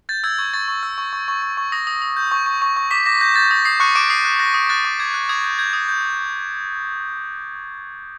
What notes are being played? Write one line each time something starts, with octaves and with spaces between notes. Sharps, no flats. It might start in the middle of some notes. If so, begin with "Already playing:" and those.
G6 A6
E6 G#6
C#6 G#6
C#6 A6
C#6
E6
C#6
C#6
C#6
C#6
C#6
D#6 A#6
D#6
D#6
G6
C#6
C#6
C#6
C#6
D6 B6
D6 A#6
G6 A#6
G6 A6
D#6 A#6
D#6 C7
C#6 F#6 C#7
D6 F#6 D7
D#6 C7
F#6
F#6 A#6
D#6
F#6 A6
D6
D6 G#6
F#6
D#6 G#6
G6
G6 G#6
D#6
G6